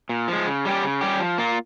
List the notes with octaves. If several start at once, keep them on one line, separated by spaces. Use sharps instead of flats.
A#2
F3 G#3
C#3
G3 C#4 G4
C#3
G3 C#4 G4
F3
A#3 F4